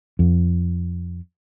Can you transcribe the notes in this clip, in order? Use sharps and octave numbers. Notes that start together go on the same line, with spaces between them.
F2